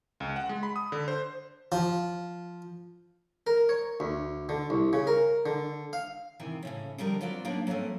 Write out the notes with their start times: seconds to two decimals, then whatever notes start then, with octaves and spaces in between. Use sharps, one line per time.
0.20 C#2
0.36 F#5
0.49 G#3
0.63 B5
0.76 D#6
0.92 D3
1.08 C5
1.72 F3
3.47 A#4
3.69 C#5
4.00 D2
4.49 D3
4.70 C2
4.93 C#3
5.07 A#4
5.46 D3
5.93 F5
6.39 C3 D#3 E3 G#4
6.63 A2 C#3 C#4
6.98 F2 D3 G3 A#4 D#5
7.21 F#3 C4 F4 B4 D5
7.45 A#3 B3 D4 D#4 C#5
7.67 F#3 A3 A#3 C4 C#4